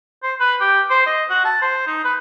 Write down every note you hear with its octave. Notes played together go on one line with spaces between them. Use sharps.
C5
B4
G4
C5
D#5
F#4
A5
C5
D#4
B4